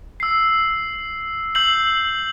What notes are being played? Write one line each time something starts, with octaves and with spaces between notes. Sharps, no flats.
E6 C7
E6 G6 C7 F#7